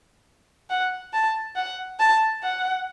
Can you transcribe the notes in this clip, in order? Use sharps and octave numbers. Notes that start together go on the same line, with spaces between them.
F#5
A5
F#5
A5
F#5